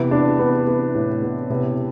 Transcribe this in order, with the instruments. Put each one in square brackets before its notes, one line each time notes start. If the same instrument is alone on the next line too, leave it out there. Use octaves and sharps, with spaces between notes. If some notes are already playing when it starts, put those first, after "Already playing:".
Already playing: [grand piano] C3 E3 [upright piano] B3
[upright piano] D4
B3
B3
A2
B3
[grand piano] C3 [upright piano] B3